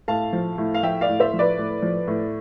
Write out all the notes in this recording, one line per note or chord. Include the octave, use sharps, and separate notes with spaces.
A2 F5 A5
F3
A2
F5
F3 E5 G5
D5 F5
A2
C5 E5
F3
B4 D5
A2
F3
A2